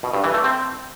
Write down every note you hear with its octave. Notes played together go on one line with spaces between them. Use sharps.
B2
G2
E3
A3
C4